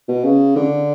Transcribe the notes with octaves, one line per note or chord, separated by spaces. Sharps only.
B2
C#3
D3